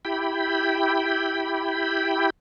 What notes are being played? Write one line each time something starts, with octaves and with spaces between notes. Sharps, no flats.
E4 G4 G5 B5